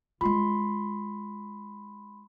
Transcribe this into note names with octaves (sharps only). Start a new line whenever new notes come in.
G#3 F4 B5 C6